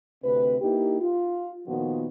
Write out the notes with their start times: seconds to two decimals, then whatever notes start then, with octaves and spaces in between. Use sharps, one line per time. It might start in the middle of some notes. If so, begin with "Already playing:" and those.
0.23 D2 C3 C4 B4
0.61 A#3 D#4 E4 G4
1.00 F4
1.67 A#2 D#3 F3 B3 F4 F#4